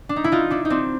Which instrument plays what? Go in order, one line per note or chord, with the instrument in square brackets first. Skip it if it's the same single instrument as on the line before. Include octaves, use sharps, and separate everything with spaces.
[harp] D4
D#4
E4
D#4 F4
D4 E4
D#4
C4 D4